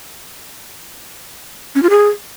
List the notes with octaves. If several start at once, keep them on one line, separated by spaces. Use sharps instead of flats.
C#4
F4
G#4